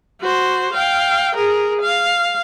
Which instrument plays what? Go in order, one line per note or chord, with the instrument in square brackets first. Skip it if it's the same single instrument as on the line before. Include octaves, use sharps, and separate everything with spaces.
[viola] F#4 C5
F5 G5
G#4 A#4
F5